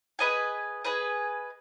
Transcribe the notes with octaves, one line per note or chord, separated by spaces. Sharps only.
G#4 B4 D#5 G#5
G#4 B4 D#5 G#5